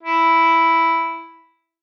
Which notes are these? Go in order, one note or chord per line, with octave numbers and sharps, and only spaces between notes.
E4